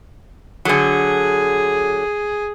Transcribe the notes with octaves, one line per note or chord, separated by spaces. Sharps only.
D3 F#3 G#4